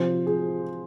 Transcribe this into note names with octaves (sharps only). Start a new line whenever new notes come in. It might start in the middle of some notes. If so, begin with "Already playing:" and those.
Already playing: C3 F3 C5
G#4